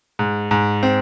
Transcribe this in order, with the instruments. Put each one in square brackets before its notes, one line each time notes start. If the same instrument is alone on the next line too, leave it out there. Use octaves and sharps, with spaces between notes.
[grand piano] G#2
G#2
C4